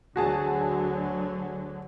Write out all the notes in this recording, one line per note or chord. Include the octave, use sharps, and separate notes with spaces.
D2 D3 F#3 F#4 G#4 A5